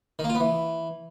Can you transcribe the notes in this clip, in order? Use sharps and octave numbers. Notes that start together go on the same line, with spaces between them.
D#3
A#3
F4
B3
E3